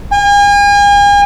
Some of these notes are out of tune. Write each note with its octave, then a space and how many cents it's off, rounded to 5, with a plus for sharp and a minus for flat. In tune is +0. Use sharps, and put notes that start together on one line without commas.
G#5 -40